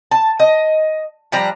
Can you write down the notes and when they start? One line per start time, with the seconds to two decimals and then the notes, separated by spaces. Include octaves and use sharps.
0.11 A5
0.40 D#5
1.32 F3 G3 D4 A#5